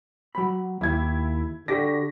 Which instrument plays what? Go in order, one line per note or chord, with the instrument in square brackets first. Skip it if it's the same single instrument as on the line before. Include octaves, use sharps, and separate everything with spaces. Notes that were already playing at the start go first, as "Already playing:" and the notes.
[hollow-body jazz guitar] F#3 B5
[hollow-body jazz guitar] D#2 [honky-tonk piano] E4 G#6
[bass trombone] D3 [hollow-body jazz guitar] F#4 G4 D5 [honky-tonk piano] A#6 B6